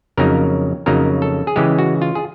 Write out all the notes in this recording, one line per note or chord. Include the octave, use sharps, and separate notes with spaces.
F2 C#3 F#3 A#3 D#4 A#4
F2 C#3 F#3 A#3 D#4 A#4
A4
G#4
C#3 E3 G#3 G4
F#4
F4
G#4